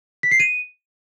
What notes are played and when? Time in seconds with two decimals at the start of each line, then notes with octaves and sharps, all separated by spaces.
0.23 B6
0.31 C7
0.40 D#7